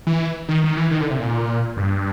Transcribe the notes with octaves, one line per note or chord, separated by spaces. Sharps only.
E3
D#3
D#3
E3
D#3
D3
C3
A#2
G2